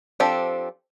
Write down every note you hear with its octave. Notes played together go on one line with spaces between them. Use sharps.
F3 C4 D4 G4 A4